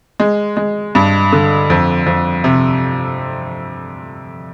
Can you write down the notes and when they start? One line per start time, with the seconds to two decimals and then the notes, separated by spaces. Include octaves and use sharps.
0.20 G#3
0.57 G#3
0.95 G2
1.32 D3
1.70 F2
2.06 F2
2.44 C3